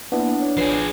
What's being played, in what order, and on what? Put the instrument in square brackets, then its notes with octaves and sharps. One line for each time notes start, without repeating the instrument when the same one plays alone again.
[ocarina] A#3 [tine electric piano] B3 E4 [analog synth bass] D4
[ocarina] C#5
[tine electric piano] A1 B4 C7 [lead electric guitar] F3 G#4